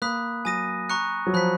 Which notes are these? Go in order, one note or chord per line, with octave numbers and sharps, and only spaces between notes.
A#3 B5 D#6 F#6 B6
F#3 G#5 D#6 A#6 D#7
A#5 C#6 F#6 C#7
F#3
F3 B5 F#6 B6